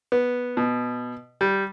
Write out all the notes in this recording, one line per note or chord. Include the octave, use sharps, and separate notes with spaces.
B3
B2
G3